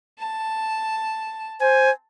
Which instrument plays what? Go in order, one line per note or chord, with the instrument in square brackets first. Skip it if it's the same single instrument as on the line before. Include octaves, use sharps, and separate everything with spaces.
[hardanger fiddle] A5
[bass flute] C5 [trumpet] G#5